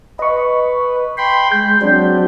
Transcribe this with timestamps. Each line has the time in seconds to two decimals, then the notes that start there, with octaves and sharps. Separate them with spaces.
0.19 B4 D#5 C#6
1.18 G5 B5 C6
1.52 G#3 G6
1.82 F#3 C4 D4